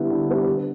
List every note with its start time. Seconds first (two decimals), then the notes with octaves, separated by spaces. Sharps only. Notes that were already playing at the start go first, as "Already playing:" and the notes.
Already playing: D3 G3 B3 E4
0.10 D3
0.28 G3 B3 E4
0.47 D3